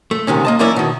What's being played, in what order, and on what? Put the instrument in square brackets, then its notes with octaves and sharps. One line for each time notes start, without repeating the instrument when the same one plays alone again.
[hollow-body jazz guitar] A3
C#2 C3 D#3 C#4
A#3 D#5 A5
E3 F#3 A#3 C#4 E4 D5
B2 D#3